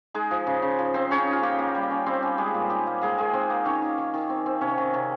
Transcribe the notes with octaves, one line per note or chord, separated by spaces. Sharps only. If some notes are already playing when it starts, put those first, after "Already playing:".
G#3 D#4 G#4
F3
C#3
C#3
F3
C4 D#4 C5
C#3 C#4 C#5
D#4
F4 F5
A#3 G4 G5
A#3
G3
C#4
G3 C4 C5
C#4
G3 G#3 G#4
A#2
D#4 G4
A#3
G#3 A#3 G#4
D#3 G#3 G#4
D#3 C4 C5
A#3
D#3 C#4 C#5
D#3
D#3
D#3
C4
C4
C3 C#4 C#5
D#3
C3